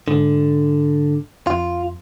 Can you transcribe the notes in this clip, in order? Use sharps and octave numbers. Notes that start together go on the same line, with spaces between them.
G#2 D3
F2 F4